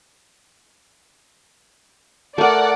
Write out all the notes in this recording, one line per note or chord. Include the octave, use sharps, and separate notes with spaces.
A3 A#4 D5 F#5